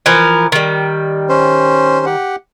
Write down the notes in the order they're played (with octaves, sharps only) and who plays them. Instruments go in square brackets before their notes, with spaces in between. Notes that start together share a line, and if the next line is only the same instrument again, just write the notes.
[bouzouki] E3 F3 A#4
D#3 G3
[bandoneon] C#4 C5
G4 F#5